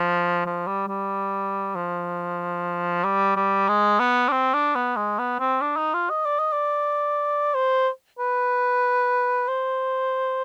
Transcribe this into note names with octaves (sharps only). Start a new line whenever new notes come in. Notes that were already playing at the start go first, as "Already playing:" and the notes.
Already playing: F3
F3
G3
G3
F3
G3
G3
G#3
B3
D4
C4
D4
B3
G#3
B3
C4
D4
D#4
F4
D#5
D5
D#5
D5
C5
B4
C5